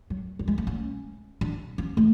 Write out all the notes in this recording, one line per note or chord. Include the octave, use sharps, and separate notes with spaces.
F#3
F#3
G#3
A3
C#4
D4
C#4
A3